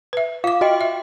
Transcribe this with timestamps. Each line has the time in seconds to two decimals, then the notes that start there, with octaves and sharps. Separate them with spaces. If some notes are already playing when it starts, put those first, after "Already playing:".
0.13 B4 E5
0.44 F4 F5 D6
0.61 F#4 D#5 G5
0.81 E5